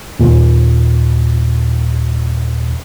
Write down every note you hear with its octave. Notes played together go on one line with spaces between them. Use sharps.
D#2 A#2